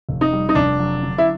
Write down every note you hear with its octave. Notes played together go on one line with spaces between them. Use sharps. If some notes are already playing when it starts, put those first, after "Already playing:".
F1
D#4
G3
D#4
F1 D4
F#3
D3
E4